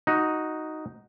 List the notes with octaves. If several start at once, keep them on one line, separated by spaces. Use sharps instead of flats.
D#4 F#4